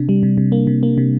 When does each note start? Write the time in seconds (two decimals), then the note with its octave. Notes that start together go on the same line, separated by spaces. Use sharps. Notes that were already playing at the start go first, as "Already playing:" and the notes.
Already playing: C3 D4
0.09 G3
0.23 C3
0.38 C3
0.52 A#3
0.67 C3
0.83 A#3
0.98 C3